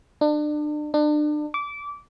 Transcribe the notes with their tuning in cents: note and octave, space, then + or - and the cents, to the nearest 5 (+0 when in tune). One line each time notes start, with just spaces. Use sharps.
D4 +35
D4 +35
D6 -20